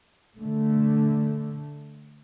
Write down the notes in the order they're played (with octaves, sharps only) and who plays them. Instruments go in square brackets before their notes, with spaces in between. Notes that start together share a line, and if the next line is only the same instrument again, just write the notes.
[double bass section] D3 A3